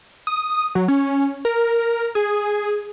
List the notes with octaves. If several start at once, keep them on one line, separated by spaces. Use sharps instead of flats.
D#6
F#3
C#4
A#4
G#4